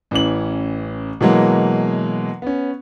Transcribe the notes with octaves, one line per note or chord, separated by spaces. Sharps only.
A1 E3 C#4 F#7
B2 E3 F#3 G#3 A#3
B3 C#4